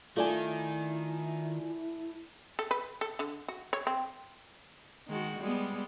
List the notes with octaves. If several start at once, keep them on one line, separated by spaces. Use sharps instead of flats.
D#3 A3 E4 F4 D5 G#5
A4
B4
A4
D3
F#4
C#5
C4
D#3 G#3 F#4
G3 G#3 B3